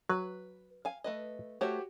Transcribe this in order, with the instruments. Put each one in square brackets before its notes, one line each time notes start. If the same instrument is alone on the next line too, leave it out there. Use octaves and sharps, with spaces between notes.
[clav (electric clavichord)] F#3 [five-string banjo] B4
[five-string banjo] F5 G#5
A3 B4 D#5
[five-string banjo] A3 C5 C#5 [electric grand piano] F#4 G4